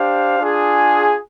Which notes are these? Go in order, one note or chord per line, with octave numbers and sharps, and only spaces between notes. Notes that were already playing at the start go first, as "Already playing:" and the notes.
Already playing: D4 G4 C5 F5
D4 F4 G#4